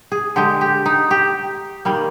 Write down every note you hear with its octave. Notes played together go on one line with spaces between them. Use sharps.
G#4
D3 G#3 G4
G4
D#4
G4
D#3 G3 A#3